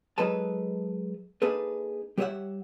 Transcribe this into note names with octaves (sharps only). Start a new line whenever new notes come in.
F#3 G#3 D#4 A4 B4 A5
A#3 D4 D#4 G#4 A4 B4
G3 G4 C#5 D#5 E5 F#5